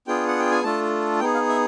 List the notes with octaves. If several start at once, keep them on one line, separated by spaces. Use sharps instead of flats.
B3 D4 F4 G#4 G5
F#5
G5
G#5
A3 D4 F4 A4 A5
B3 D#4 G#4 G5
F5
E5